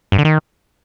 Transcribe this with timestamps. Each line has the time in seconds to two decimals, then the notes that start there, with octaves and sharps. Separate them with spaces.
0.12 G2
0.18 D3
0.25 D#3